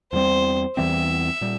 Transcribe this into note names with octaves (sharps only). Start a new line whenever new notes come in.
E2 E3 G3 C4 C5
E2 E3 G3 C4 E5
A#2 G3